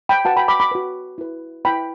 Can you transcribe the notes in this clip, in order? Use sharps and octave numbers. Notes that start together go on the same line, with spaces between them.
G5 B5
F#4 B4 F#5 A5
G5 B5
B5 D6
B5 D6
F#4 B4
E4 B4
E4 B4 G5 B5